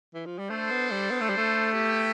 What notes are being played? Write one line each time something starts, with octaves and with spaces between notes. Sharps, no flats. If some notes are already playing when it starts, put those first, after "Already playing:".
E3
F3
G3
A3 D4 A4 C5
B3
G3
B3
A3
G3
A3
B3 E4 G4